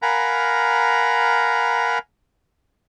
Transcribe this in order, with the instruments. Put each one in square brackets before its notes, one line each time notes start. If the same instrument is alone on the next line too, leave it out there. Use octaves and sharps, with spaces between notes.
[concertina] A#4 F5 F#5 G#5 A#5 B5